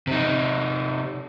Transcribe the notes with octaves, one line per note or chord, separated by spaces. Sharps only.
C3 D#4